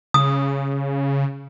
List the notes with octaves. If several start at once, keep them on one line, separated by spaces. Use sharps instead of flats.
C#3 D#6